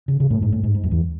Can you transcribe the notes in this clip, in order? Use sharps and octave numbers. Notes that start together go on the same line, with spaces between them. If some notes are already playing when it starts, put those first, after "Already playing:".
C#3
C#3
A2
G#2
A2
G#2
G#2
F#2
E2